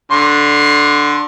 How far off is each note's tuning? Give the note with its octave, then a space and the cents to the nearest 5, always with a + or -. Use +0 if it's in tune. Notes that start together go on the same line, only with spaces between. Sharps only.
D3 +0 C6 +30